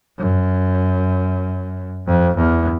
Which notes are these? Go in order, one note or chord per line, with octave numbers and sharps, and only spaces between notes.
F#2
F2
E2